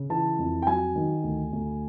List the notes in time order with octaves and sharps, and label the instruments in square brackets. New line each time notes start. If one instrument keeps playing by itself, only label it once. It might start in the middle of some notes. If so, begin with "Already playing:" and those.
Already playing: [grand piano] C#3
E3 A5
F2
G5
F#3 G#5
D#3
D2
D2